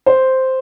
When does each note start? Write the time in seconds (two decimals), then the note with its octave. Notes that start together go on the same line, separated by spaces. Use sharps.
0.06 C5